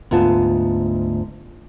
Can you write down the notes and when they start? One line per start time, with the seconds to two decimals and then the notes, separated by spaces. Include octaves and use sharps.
0.11 D2 G#2 B3 F4 A5